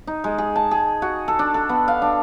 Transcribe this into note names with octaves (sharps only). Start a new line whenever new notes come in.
D#4
G#3
G#4
A5
G#4
F#4
A4
D4
A4
B3
F5
D4